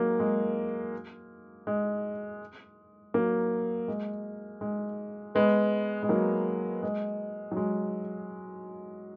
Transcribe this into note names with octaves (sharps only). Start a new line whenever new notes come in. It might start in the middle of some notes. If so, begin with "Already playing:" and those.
Already playing: F#3 G#3 A#3
G#3
G#3
F#3 A#3
G#3
G#3
G#3 B3
G#3
F#3 A#3
G#3
F#3
G#3